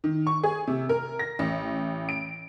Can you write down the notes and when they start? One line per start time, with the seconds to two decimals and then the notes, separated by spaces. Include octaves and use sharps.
0.04 D#3
0.27 C#6
0.44 G#4
0.67 C3
0.89 A#4
1.19 A#6
1.39 A1
2.09 D7